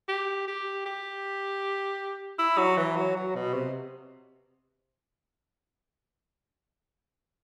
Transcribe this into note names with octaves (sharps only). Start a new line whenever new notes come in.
G4
G4
G4
E4
F#3
E3
F#3
F#3
B2
C3